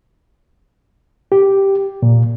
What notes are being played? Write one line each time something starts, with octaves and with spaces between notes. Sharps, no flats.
G4
A#2